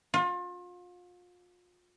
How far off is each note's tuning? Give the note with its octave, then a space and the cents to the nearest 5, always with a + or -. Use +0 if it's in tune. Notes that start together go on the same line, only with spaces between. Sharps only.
F4 +35